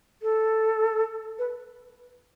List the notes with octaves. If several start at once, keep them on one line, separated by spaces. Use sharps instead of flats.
A4
B4